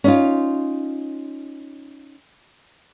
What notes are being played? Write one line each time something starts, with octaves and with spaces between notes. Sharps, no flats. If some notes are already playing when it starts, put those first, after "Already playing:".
C#4 D#4 F4